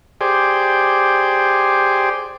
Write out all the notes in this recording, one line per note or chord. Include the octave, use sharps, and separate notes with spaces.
G4 G#4 C5 D5